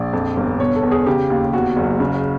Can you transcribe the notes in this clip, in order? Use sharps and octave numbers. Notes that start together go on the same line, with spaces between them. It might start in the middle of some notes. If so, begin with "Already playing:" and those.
Already playing: A#1 D5
F2
G1
B2 C#5
A4
E2
G#4
C#3 G4
D#2
E2 F#4
F#1
C#3